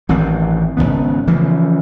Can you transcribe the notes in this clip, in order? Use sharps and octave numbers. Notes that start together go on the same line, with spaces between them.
A1 D#3 E3 C4
G#1 G2 C#3 B3
C#3 E3 F3 A3